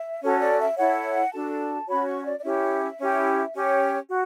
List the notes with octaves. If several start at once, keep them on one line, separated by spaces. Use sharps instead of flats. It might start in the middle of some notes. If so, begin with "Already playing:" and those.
Already playing: E5
C#4 F#4 A4 C#5
D5
E5
E4 A4 C#5 F#5
D4 F#4 A4 A5
C#4 F#4 C#5 B5
C#6
D5
D5
C#4 E4 G4 C#5 E5
C#4 E4 G4
C#4 G4 C#5
F#4